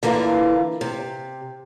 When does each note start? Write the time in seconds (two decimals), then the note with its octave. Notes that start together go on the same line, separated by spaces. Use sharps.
0.03 D3 E3 A#3 F4
0.81 C3